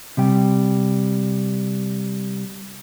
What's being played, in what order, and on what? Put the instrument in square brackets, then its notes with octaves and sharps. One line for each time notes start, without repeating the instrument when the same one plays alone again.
[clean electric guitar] C3 G3 G5